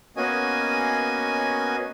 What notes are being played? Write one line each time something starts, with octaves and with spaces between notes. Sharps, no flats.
A#3 B3 C#4 F#4 D#5 G#5